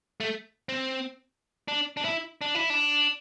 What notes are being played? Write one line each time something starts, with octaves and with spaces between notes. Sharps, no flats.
A3
C4
D4
D4
E4
D4
E4
D4